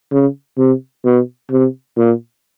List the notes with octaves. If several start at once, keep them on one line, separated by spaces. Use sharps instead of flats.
C#3
C3
B2
C3
A#2